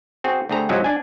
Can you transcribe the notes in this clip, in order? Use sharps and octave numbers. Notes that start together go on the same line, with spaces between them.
C4 F#4 G#4
D2 C3 C4 G#4 A4 A#5
G#2 C3 F3 F#3 G#3
D4 G#5